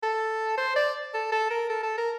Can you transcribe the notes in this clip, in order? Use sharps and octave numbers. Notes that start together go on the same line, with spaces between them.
A4
C5
D5
A4
A4
A#4
A4
A4
A#4